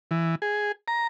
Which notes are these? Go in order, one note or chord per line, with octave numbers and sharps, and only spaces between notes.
E3
G#4
A#5